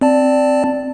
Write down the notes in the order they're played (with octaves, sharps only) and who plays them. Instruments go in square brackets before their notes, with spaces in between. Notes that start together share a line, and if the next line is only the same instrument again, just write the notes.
[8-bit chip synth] C4 D5 A5